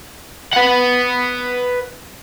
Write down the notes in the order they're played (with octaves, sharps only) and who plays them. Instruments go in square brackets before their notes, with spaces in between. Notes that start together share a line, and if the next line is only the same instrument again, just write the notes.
[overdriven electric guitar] B4 F#5